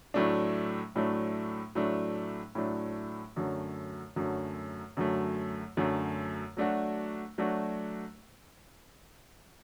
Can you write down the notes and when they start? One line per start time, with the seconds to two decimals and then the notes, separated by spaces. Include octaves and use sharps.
0.14 A2 F#3 A3 D4
0.96 A2 F#3 A3 D4
1.75 A2 F#3 A3 D4
2.55 A2 F#3 A3 D4
3.36 F#2 D3 F#3 A3
4.16 F#2 D3 F#3 A3
4.97 F#2 D3 F#3 A3
5.77 F#2 D3 F#3 A3
6.57 F#3 A3 D4 F#4
7.38 F#3 A3 D4 F#4